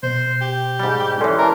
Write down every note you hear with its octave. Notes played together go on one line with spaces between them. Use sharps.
B2 C5
G4
G#2 G3
E3 C#4 A4 D5 C6
A#4 A5 A#5